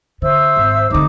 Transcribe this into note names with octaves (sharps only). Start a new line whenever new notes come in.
D3 C5 E5 E6
G#1
F1 D3 D#4 D6